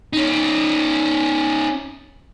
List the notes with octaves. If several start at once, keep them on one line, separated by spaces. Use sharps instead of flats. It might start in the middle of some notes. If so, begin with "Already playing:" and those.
C#4 D#4